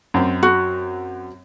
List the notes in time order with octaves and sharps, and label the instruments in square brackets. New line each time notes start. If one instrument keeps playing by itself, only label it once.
[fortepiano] F#2 C4
[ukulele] F#4